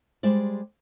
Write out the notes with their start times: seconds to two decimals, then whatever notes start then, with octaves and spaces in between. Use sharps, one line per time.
0.23 G3 G#3 C5 D5